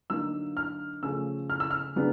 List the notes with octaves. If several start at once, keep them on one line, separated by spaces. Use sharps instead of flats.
D3 F#3 A#3 D#4 E6
F6
C#3 F3 A3 C#4 E6
F6
E6
F6
C#3 F#3 B3 D4